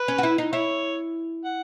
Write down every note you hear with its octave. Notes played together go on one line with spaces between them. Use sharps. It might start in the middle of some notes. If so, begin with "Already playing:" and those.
Already playing: B4
C#4
F#4
E4
D#4
E4 C#5
F#5